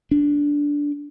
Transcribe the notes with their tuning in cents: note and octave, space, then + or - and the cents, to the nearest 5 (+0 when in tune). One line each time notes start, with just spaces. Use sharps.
D4 -10